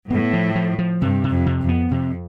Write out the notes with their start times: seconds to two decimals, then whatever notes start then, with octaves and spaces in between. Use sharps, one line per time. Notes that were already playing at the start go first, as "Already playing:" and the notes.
0.10 A2 B3
0.33 F3
0.55 F3
0.79 F3
1.01 G2 C3
1.24 C3
1.31 F2
1.46 C3
1.61 F2
1.69 B3
1.91 F2 C3